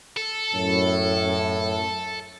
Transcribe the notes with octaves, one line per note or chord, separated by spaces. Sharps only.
A4
F#2 A2